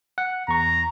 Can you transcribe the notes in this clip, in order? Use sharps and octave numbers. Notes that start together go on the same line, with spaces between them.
F#5
E2 A#5 C#6